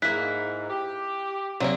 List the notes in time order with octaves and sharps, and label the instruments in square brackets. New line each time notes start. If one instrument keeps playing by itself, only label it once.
[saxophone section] G#2 [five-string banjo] A#3 E4 [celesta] F#6 B6
[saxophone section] G4
[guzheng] C3 [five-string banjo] F#3 A3 A#3 [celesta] D5